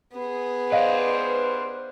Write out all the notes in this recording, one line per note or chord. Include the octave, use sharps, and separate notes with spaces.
B3 G#4
B4 C5 D5 D#5 F5